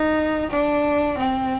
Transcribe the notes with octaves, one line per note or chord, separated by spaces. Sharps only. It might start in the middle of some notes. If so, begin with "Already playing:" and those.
Already playing: D#4
D4
C4